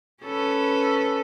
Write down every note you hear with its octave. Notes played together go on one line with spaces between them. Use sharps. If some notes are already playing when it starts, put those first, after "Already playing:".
C#4 A4 B4